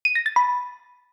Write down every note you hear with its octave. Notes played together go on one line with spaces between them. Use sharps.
D#7
A#6
A6
B5